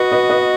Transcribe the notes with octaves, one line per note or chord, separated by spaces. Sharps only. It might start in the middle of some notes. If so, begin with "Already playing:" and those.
Already playing: F#4 B4 D#5
B4 D#5
B4 D#5